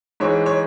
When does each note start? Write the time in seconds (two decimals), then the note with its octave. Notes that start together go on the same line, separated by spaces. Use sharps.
0.20 G#2 E3 G#3 C#5
0.46 C#5